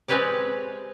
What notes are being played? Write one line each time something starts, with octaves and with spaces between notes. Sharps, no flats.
G#3 C4 G4 B4 C#5 D5